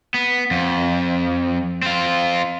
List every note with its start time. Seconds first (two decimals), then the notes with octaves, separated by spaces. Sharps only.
0.14 B3
0.51 F2
1.82 C4 F4